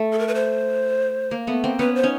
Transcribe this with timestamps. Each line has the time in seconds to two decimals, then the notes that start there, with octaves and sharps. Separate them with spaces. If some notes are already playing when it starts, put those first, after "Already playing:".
Already playing: A3
0.13 A4
0.19 A#4
0.28 B4
0.35 C5
1.31 A#3
1.47 A3 B3
1.64 A#3 C4
1.79 B3 C#4 B4
1.95 C5
2.03 C#4 D#4